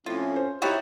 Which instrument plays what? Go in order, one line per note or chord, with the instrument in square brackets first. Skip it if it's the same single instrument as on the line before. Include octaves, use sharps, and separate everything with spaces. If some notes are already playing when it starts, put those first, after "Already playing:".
[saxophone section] F2 A2 [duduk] C#4 [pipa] F4
[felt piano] C5
[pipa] D#4 F#4 C#5 [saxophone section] E4 [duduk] G4 [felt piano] G5 F#6 A6